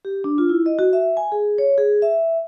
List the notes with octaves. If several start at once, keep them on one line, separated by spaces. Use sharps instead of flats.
G4
D4
F4
E4
D#5
F#4
E5
G#5
G#4
C#5
G#4
E5